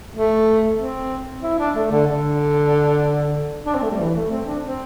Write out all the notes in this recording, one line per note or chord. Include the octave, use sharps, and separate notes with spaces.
A3
C4
E4
D4
A3
D3
D3
D4
C4
A3
G3
E3
A3
C4
D4
C4